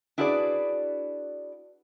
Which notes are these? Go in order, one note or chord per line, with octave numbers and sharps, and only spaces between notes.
D4 E4 F#4 G#4 B4 D5